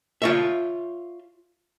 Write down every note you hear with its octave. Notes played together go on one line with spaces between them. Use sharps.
F4 C#5 E5